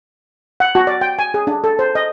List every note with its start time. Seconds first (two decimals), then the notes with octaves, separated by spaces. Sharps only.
0.60 F#5
0.75 F#4
0.87 D5
1.01 G5
1.19 G#5
1.34 G#4
1.47 D4
1.64 A4
1.79 C5
1.95 D#5